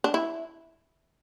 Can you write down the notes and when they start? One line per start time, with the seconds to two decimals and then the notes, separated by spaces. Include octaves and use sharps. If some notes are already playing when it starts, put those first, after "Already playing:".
0.04 D4
0.14 E4